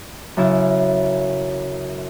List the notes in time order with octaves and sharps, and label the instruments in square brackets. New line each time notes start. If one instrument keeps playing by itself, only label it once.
[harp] F#2 C#3 E4